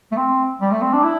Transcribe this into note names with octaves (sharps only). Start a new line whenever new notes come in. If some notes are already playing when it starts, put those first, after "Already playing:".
A3
C4
G3
A3
C4
D4
E4